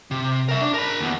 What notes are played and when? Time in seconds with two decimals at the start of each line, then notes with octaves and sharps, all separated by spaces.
0.11 C3
0.49 A#4 E5
0.62 D4
0.74 A#4 B5
1.00 D#2 B3